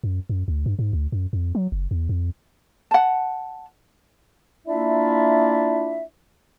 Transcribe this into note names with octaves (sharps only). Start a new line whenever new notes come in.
F#2
F#2
D2
G2
G#2
D2
F#2
F2
F#3
F#1
E2
F2
F#5 A5
A#3 D4 E4 F4 D5 E5